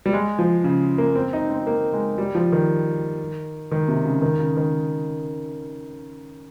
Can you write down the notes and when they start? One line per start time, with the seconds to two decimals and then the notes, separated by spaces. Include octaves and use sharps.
0.06 G3
0.13 G#3
0.39 F3
0.64 C#3
0.98 A#3
1.16 C4
1.33 D#4
1.50 C4
1.67 A#3
1.93 G#3
2.18 G3
2.35 F3
2.52 D#3
3.71 D#3
3.88 C3
4.05 C#3
4.22 D#3
4.39 C#3
4.57 D#3